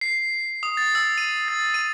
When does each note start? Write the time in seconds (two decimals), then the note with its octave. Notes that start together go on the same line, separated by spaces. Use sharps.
0.01 C7
0.63 D#6
0.77 A6
0.95 E6
1.18 D#7
1.48 A6
1.74 D#7